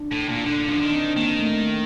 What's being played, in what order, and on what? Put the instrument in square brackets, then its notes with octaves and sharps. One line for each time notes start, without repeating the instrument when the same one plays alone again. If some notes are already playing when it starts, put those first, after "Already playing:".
Already playing: [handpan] D4
[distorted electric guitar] A2
A#2
[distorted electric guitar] D3 [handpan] D4
[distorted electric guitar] F3 [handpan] D4
[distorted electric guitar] D#3
[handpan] C4
[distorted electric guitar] D#3 [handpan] A#3
[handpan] A3
A3